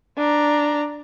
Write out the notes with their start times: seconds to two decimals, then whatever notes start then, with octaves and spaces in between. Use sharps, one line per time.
0.17 D4 A#5